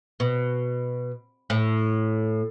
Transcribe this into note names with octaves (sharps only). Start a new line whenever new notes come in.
B2
A2